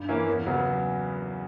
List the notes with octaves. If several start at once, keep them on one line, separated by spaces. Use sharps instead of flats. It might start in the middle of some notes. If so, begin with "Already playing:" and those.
Already playing: G2
E3 A#3 C#4 E4
E2
C#3 F#3 B3